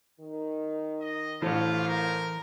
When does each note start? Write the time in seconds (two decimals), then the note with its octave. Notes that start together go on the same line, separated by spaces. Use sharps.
0.20 D#3
1.01 D#5
1.42 A1 A2 E3 F4 C5 C#5
1.88 A#4